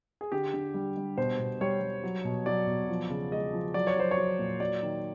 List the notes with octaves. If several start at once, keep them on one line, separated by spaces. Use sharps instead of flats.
G#4
D3 G4
D3
G3
G3
B2 C5
B2
G3 C#5
G3
F#3
B2
F#3 D5
B2
F3
C#3
G#3 D#5
F3
F#3 D5
C#5
F#3 C5
C#5
F#3
A#2
F#3 D5
D#3